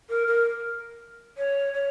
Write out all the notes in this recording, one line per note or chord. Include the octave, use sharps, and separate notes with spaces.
A#4
A#4
C#5
C#5